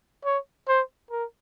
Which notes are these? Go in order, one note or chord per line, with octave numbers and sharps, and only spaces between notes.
C#5
C5
A#4